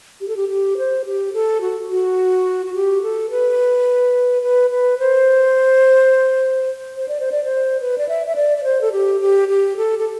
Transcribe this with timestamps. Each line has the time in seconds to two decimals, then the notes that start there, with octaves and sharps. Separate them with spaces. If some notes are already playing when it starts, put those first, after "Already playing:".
0.21 G4
0.28 A4
0.36 G4
0.49 G4
0.77 C5
1.05 G4
1.33 A4
1.61 F#4
1.89 F#4
2.66 F#4
2.74 G4
3.02 A4
3.30 B4
4.42 B4
4.71 B4
4.99 C5
6.96 C5
7.08 D5
7.20 C5
7.32 D5
7.44 C5
7.81 B4
7.98 D5
8.09 E5
8.27 E5
8.36 D5
8.57 D5
8.64 C5
8.81 A4
8.92 G4
9.21 G4
9.49 G4
9.77 A4
9.99 A4